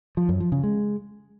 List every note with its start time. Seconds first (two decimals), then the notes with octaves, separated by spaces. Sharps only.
0.17 F3
0.29 F#2
0.40 F3
0.52 C#3
0.63 G#3